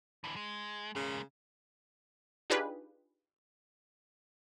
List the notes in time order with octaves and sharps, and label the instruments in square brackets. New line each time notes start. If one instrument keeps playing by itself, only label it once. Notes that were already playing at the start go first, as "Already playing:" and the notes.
[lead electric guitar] D3 E3
G#3
[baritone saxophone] C#3 [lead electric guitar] G#3 A#3
[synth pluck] D4 D#4 F4 G4 G#4 B4